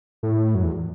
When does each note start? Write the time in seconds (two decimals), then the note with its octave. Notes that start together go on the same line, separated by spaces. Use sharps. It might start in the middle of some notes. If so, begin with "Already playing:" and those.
0.23 A2
0.55 F#2
0.63 E2